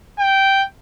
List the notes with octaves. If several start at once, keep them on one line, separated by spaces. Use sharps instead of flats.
G5